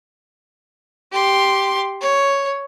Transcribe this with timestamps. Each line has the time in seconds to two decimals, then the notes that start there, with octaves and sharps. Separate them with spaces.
1.12 G4 C6
2.01 C#5